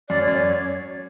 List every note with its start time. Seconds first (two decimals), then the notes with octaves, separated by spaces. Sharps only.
0.09 F#2 D5
0.22 C#5
0.28 F#2
0.34 D5
0.47 C#5